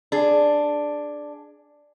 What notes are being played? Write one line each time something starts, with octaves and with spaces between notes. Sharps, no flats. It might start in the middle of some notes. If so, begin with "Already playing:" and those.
D4 G#4